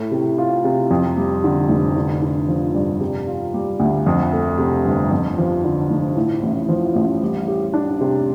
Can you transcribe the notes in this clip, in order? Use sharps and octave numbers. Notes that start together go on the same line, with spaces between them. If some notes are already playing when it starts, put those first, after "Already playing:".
Already playing: A2 A3
C3
F4
C3
F2
G3
D3
F1
D3
D4
F3
G2
C3
F4
G3
D2
F2
A3
C3
G1
F2
F3
D3
F1
A2
A1
F3
A1
G3
G4
D4
C3